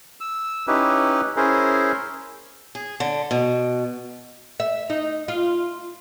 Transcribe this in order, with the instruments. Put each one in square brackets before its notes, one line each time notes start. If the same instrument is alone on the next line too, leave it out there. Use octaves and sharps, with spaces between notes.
[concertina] E6
C#4 D#4 E4 G4 B4
C#4 E4 G#4 A#4 C5
[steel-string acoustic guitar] G#4
D3
B2
[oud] E5
D#4
F4